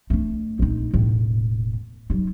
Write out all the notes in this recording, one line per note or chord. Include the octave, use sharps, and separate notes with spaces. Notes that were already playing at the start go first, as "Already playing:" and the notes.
A3 D4
A#1 D#4
E1 A2
F#3 D#4